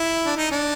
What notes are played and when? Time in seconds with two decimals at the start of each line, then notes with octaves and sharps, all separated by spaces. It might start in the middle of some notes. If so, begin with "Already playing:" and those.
Already playing: E4
0.26 D4
0.37 D#4
0.51 D4